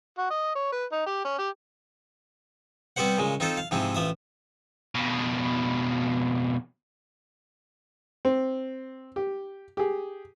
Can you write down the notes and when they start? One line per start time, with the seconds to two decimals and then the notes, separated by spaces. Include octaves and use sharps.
0.18 F#4
0.30 D#5
0.55 C#5
0.72 B4
0.92 D#4
1.06 G4
1.25 C#4
1.39 G4
2.96 G3 B3 C4 G4 C5 F#5
3.18 A#2 C#3 G#3
3.40 C4 D#4 F4 A4 C5
3.57 F5
3.71 G#2 C3 F3 C4 E4
3.95 A1 F3 E5 D#6
4.95 F2 B2
8.25 C4
9.16 G4
9.77 G4 G#4